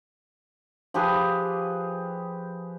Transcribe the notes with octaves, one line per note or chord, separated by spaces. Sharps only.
F3 G4 G#4 B4